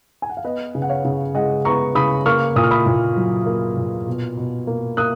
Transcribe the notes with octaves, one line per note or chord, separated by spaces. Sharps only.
G#5
F#5
F5
B3 B4 D#5
C#3
F#5
C#5 F5
C#3
G#3 D#5 F#5
B3 A#5 C#6
C#3 B5 D#6
A#3 C#6 F6
A#2 D#6
F6
B5 D#6
A#2
F#3
A#3
A#2
B2
B2
A#3
A#3 D#6 F#6